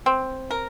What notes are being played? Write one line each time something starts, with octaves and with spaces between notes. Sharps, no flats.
C4
A#4